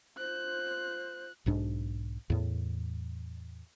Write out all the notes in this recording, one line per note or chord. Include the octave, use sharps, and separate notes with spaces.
F4 C5 F#6
B1 G#2 D4
E2 A2